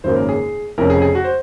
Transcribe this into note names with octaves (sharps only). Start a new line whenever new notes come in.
G#1 F#2 C#3 F#3 A#3 C5
A#4
G#4
F1 F2 C#3 A#4
G#4
G#4
F#4
C5